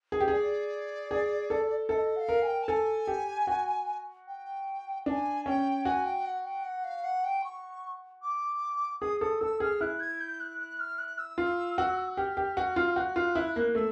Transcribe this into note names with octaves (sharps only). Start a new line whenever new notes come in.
G#4
G4
G#4 D5
G#4
A4
A4 E5
D#5
F#5
F5
A#4
G#5
G5
A5
A4 G#5
G4
F#4
G5
D4 G#5 A5
C#4 G5
F#4 G#5
G5
F#5
G5
F#5
F5
F#5
G5
C#6
D6
G#4 D#6
A4 D#6
A4 E6
G#4 F6
E4 F#6
G#6
G6
F#6
F#6
F6
F#6
E6
F4
F#4
G4 F6
G4
F#4
F4
F#4 F#6 G6
F4
E4
A#3
A3 E6